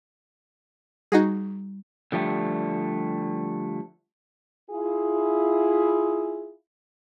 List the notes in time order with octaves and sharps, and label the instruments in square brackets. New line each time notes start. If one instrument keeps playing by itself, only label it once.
[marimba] G3 [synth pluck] D#4 F#4 G#4
[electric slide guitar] D3 F3 G3 A3
[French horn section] E4 F4 G#4